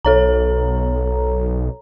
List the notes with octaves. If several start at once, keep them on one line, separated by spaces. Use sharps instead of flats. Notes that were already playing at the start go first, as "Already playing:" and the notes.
B1 A4 C#5 A#5